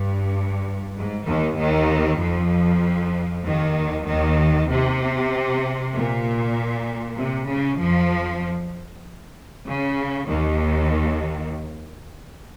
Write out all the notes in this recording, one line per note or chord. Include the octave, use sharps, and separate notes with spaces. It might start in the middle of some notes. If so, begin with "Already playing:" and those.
Already playing: G2
G#2
D#2 D#3
D#2 D#3
F2 F3
D#2 D#3
D#2 D#3
C3
A#2
C3
C#3
F2 F3
C#3
D#2 D#3